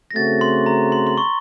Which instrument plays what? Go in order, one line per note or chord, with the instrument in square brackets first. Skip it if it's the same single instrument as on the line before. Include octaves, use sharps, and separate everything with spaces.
[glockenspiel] A#6
[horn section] C#3 A3 C4 F#4 [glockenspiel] A6
[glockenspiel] C6
A#5
C6
C6
C#6